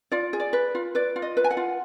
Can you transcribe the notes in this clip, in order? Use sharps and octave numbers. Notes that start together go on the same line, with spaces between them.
F4 D5
G#4
D5
B4
F4
B4 D5
F4
D#5
B4
G#5
F#5
F4